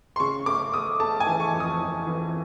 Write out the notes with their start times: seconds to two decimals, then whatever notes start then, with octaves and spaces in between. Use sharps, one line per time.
0.16 C6
0.20 C#3 C#6
0.46 A3 D6
0.73 A3 D#6
1.00 A3 A5
1.20 G#5
1.27 E3
1.40 C#6
1.53 F2
1.60 D#6
1.81 E3
2.07 E3